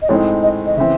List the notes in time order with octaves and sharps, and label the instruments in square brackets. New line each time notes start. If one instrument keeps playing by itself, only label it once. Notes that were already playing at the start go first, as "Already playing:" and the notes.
[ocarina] D#5
[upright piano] A2 G#3 C4 D#4 [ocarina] C#5
[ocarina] D#5
D#5
[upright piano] C#3 E3 C4 [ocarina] E5